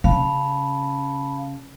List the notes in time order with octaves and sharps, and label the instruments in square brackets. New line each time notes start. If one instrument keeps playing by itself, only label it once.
[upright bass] C#3 [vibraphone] F5 A5 B5